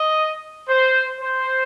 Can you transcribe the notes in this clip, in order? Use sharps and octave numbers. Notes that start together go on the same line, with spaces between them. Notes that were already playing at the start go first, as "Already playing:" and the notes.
Already playing: D#5
C5
C5